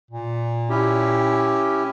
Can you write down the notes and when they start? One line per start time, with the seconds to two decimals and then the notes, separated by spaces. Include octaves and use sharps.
0.11 A#2
0.70 C#4 E4 G4